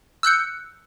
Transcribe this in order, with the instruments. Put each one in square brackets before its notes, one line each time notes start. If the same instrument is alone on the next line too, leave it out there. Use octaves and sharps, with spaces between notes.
[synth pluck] E6 F#6 G6 C#7